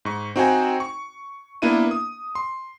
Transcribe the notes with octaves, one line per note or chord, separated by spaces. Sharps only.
G#2 C#6
C4 D#4 F#4 C5 G5 G#5
C#6
A#3 B3 D4 E4 E5 D#7
D#6
C6